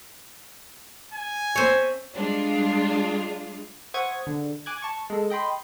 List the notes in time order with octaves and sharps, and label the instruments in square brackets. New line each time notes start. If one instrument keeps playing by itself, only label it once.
[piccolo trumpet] G#5
[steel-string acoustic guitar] C4 E5 [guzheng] C5 C#5
[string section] G3 G#3 D4 F4
[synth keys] C5 E5 F#5 C#6 D#6 G#6
D3
G#5 D6 F#6 G#6
A5 C#6
G#3 A4
D#5 G5 B5 C6